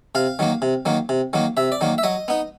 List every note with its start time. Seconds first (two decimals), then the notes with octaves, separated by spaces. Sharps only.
0.15 C3 F5
0.39 D#3 F#3 A#3
0.62 C3
0.85 D#3 F#3 A#3
1.09 C3
1.33 D#3 F#3 A#3
1.57 C3 E5
1.72 D5
1.81 D#3 F#3 A#3
1.98 E5
2.03 F#3 D#5
2.28 B3 D#4